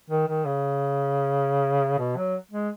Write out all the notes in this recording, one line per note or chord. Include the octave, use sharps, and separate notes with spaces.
D#3
D#3
C#3
B2
F#3
G#3